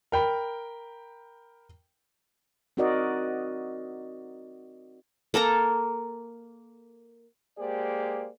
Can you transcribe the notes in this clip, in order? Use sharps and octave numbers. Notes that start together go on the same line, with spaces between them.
A#4 G5 B5
C4 D#4 F#4 A#4 D5 D#5
A#3 A4 A#4 A#5
G#3 A#3 G4 G#4 C5 D5